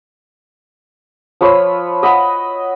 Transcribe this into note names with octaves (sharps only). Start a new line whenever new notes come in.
F3 B4 C#5 E6
D#5 E5 F#5 B5